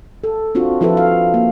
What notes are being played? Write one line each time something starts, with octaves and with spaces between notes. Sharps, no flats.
A4
C4 D4 F4 F#4
F3 E4 F4 A4 B4
F5
A#3